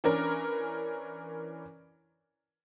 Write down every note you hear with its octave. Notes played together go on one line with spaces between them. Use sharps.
E3 C#4 D4 A#4